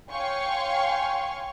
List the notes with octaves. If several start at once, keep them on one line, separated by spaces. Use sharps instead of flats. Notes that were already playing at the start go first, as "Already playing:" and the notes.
C#5 F5 G5 G#5 C6 C#6